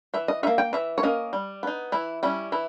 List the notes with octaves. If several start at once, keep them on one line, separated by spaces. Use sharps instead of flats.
E3 E5
D#5
A#3 D#4 E5
G5
E3 E5
C#5
A#3 C#4 D#5
G3
B3 D#4
E3 E4
G3 C#4 E4
E3 E4